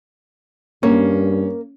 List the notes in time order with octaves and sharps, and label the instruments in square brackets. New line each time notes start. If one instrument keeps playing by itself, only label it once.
[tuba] G2 [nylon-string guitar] A#3 [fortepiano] C#4